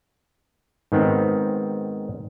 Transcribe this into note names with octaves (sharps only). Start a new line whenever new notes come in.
G#2 D#3 B3 C4